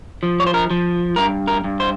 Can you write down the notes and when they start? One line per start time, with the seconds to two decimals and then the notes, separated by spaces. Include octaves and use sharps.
0.23 F3
0.40 C#5
0.47 C5
0.54 A#4
0.70 F3
1.16 G2 A#4
1.48 A#4
1.64 G2
1.80 C5